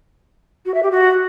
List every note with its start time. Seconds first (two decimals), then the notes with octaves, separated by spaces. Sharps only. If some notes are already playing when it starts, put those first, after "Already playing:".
0.66 F#4
0.74 E5
0.83 G4
0.91 F#4